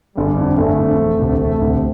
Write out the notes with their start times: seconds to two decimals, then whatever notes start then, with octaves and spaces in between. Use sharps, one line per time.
0.16 G1 G3
0.37 F2 D3
0.58 G1 A3
0.79 F2 D3
1.00 E1
1.21 D2 C3
1.40 E1 A3
1.62 D2 C3